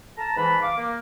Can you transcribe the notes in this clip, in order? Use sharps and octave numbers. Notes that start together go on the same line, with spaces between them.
A5 A#5
G#2 E3 B4 A5 B5
F5 D6
A#3